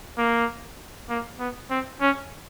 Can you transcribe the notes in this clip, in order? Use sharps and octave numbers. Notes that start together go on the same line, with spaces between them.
A#3
A#3
B3
C4
C#4